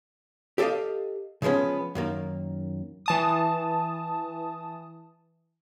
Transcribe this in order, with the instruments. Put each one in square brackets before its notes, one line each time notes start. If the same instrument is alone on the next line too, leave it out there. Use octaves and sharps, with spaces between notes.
[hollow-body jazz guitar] G4 A4 C#5 D#5 F5
C#3 F3 G#3 B3 C#4
F#2 D#3 A#3
[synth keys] E3 A5 D#6